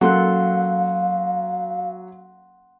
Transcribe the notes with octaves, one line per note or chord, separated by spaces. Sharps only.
F#3 A#3 C#4 A4 F5 F#5 C6 F#6